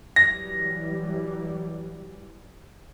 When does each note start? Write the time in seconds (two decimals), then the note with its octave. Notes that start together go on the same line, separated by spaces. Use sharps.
0.16 E3 F#3 G3 A#6